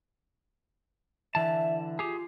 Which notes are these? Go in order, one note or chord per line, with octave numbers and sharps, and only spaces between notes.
D3 E3 E5 A5
F4 G4 G#4